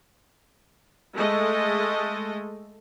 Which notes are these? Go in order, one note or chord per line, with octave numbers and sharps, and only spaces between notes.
G#3 A3 A4 D#5